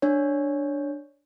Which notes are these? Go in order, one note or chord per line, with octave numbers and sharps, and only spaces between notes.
D4 C#5